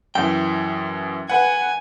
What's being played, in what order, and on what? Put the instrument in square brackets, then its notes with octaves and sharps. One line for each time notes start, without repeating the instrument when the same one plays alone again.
[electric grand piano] F#2 E3 [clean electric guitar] G5
[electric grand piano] B4 F#5 [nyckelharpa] G#5